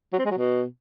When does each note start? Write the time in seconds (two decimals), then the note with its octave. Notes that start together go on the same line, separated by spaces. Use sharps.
0.13 F#3
0.19 C4
0.25 G#3
0.31 F#3
0.37 B2